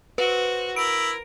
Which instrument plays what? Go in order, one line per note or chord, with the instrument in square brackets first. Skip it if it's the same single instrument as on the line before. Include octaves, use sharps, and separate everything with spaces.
[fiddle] F#4 C5 [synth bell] B4
[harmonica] E4 [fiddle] A#4 [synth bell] D7